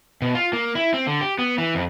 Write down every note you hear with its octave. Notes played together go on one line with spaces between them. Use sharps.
B2
F4
A#3
E4
C4
D3
G4
B3
E3
F2